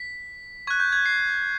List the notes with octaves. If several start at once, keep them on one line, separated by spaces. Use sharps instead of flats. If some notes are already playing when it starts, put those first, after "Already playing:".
Already playing: B6
C#6 F#6 G#6
G6
G#6
C7